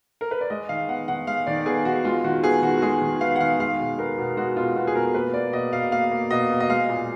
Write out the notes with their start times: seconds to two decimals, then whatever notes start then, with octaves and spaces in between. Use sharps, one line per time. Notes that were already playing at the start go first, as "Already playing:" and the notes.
0.21 A#4
0.31 B4
0.41 D5
0.50 G#3 D#5
0.69 D#3 F5
0.88 B3 F#5
1.08 D#3 F#5
1.27 G#3 F5
1.47 D#3 D5
1.66 B3 G#4
1.85 D#3 F#4
2.04 G#3 F4
2.24 D#3 F#4
2.43 B3 G#4
2.62 D#3 F#4
2.77 F#4
2.82 G#3 G#4
3.01 D#3
3.21 B3 F5
3.36 F#5
3.40 D#3 F5
3.59 G#3 F5
3.79 B2
3.98 B3 A#4
4.18 B2
4.37 G#3 F#4
4.56 B2 F4
4.76 B3 F#4
4.87 G#4
4.95 B2 A#4
5.14 A#3 B4
5.34 A#3 D5
5.53 B2 D#5
5.72 B2 F5
5.92 A#3 F5
6.11 A#3
6.31 B2 D#5
6.50 B2
6.60 D#5
6.69 G#3 F5
6.89 A#2